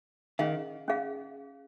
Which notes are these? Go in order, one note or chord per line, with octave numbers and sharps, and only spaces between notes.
D#3 C#4 G#4 F5
C#4 G#4 F5